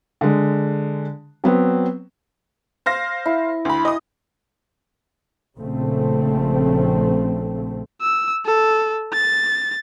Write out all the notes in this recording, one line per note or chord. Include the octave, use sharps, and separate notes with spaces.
D3 G#3
F#3 B3 C4
C5 F5 A#6
E4
D2 B5
D#5 D#6
A#1 C#3 A3 C4
E6
A4
A6